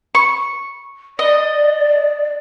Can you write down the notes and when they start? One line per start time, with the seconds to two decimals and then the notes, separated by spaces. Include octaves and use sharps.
0.15 C#6
1.19 D5 D#5